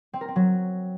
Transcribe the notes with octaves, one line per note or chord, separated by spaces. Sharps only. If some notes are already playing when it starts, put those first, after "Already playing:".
C4
A#4
C4
F#3